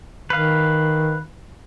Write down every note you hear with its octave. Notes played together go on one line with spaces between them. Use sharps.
D#3 B4 F5